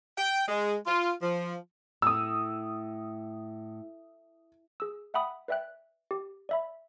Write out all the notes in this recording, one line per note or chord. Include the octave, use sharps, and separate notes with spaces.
G5
G#3
F4
F3
A2 D#6 E6
G#4 E6
E5 F#5 G5 B5 D#6
B4 D5 E5 G5 F#6
G4
D5 E5 B5